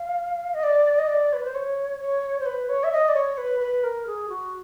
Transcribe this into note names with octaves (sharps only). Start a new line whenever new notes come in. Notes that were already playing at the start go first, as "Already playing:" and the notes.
Already playing: F5
D#5
D5
D#5
D5
B4
C5
C#5
C#5
C5
B4
C#5
E5
D#5
D5
C#5
B4
B4
A#4
G#4
F#4